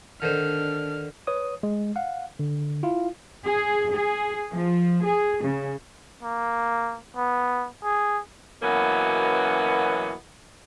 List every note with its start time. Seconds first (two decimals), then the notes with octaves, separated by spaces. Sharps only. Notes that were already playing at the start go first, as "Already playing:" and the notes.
0.22 D3 D#3 D4 C5 F6
1.27 B4 C#5 D#6
1.63 G#3
1.96 F5 F#5
2.39 D3
2.83 E4 F4 F5
3.45 G#4
3.92 G#4
4.51 F3
5.04 G#4
5.43 C#3
6.23 A#3
7.17 B3
7.84 G#4
8.62 F#2 B2 E3 A#3 B3 C#4